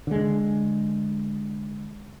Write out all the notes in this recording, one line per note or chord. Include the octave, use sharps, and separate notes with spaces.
D3 G#3